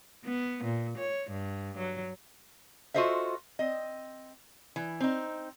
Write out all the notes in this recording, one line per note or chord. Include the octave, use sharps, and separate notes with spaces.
B3
A#2
C#5
G2
F#3
F4 F#4 A4 C5 D#5 E5
C4 D#5
E3
C4 D#4